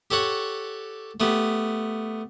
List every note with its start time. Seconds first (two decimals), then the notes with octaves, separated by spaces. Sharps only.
0.11 G4 A4 C#5 F#5 C#6
1.20 A3 B3 G4